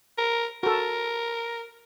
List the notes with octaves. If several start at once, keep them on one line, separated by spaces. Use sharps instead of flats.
A#4
F#4 A4 A#4